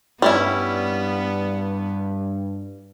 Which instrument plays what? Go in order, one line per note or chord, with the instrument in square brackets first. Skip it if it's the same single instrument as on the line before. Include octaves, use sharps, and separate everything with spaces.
[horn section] G2 [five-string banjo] G3 C#4 E4 [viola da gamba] B3